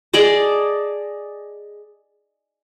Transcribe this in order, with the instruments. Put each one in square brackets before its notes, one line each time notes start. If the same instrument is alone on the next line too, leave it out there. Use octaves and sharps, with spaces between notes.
[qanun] G#4 D5 D#5 A5